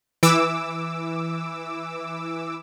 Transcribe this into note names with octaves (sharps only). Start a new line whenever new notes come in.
E3 D6 E6